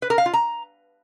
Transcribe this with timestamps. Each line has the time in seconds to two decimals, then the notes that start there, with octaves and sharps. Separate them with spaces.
0.02 B4
0.10 A#4
0.18 F5
0.26 F4
0.33 A#5